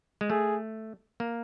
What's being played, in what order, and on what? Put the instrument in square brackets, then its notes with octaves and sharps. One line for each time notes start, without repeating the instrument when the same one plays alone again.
[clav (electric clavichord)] G#3
[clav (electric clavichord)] A3 [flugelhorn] G#4
[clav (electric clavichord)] A#3